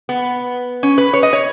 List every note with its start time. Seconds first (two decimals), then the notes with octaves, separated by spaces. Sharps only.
0.09 B3
0.83 C#4
0.98 B4
1.13 C#5
1.23 D#5
1.33 C#5